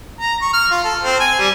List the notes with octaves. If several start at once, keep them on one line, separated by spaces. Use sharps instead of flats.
A#5
C#6
F6
F4
A4
C4
G#5
G3